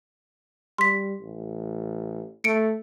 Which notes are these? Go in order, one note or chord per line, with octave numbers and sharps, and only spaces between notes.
G3 C6 B6
A1
A3 C#7 D7